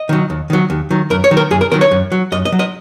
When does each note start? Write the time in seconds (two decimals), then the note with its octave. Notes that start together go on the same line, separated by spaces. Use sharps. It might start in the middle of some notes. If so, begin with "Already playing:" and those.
Already playing: D#5
0.09 D#3 F#3
0.30 D#2
0.50 D#3 F#3
0.70 D#2
0.91 D#3 F#3
1.10 F#2 A#4
1.24 C#5
1.31 D#3 F#3
1.37 A#4
1.51 F#2 G#4
1.61 A#4
1.72 D#3 F#3 A#4
1.81 C#5
1.91 F#2
2.12 F#3
2.32 F#2 D#5
2.45 D#5
2.52 F#3
2.59 D#5